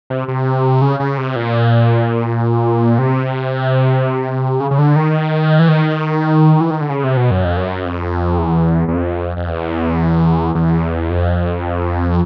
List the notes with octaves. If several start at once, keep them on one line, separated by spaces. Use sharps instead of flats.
C3
C3
C#3
C#3
C3
A#2
C3
C#3
C#3
D3
D#3
E3
D#3
E3
D#3
D3
C#3
C3
B2
F#2
F2
F#2
F2
E2
E2
F2
F2
E2
E2
F2